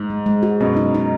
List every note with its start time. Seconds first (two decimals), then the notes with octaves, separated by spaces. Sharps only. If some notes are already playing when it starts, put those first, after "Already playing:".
Already playing: G#2
0.10 G#3
0.26 G#3
0.43 F#4
0.60 F#2 B2 B3
0.77 D#4
0.94 D#4